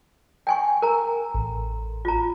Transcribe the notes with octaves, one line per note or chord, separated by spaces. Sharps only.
G5 G#5 C#6
A#4 A#5
A1
F4 A#5